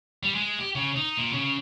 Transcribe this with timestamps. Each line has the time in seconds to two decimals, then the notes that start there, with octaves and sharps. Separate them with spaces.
0.23 G3
0.35 G#3
0.59 G4
0.75 C#3
0.96 D#4
1.17 A#2
1.32 C#3